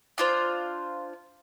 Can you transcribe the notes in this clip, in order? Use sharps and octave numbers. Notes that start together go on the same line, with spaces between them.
D4 F4 C5